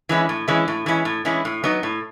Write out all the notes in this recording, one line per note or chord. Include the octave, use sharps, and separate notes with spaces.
E3 G#3 C#4 E4
A2
E3 G#3 C#4 E4
A2
E3 G#3 C#4 E4
A2
E3 G#3 C#4 E4
A2
F#3 B3 D#4
A2